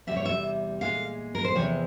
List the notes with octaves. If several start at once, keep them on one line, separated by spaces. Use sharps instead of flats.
E2 C3 G3 E5
C#5
E5
A#2 G#3 F5
A#4
C5
E2 C3 F3 G#3 C#5